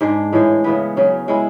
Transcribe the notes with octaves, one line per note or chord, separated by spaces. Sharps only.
G#2 G#3 D4
A2 E3 G#3
C#3 E3 B3
C#3 F#3 C#4
G#3 C#4 E4 G#4